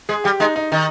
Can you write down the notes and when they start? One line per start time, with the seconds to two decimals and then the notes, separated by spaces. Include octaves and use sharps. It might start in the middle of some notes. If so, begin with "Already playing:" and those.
0.09 G#3 G#4
0.24 G3 G4
0.40 G#3 D#4
0.56 D#4
0.72 D#3 D#4